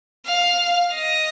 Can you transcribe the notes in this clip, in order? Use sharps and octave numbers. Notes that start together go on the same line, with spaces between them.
F5
D#5